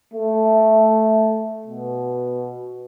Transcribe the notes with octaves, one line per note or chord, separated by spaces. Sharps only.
A3
B2